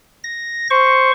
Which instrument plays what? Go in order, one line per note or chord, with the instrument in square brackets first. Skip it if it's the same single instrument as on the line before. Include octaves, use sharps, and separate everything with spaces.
[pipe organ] A#6
C5 C#6